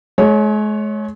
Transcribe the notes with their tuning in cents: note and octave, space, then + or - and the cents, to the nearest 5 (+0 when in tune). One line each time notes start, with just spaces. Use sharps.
G#3 +40 C#5 +0